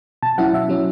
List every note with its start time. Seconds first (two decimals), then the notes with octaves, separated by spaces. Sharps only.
0.22 B2 A5
0.38 F#3 C#4 E4 F#5
0.53 B2 E5
0.69 F#3 C#4 E4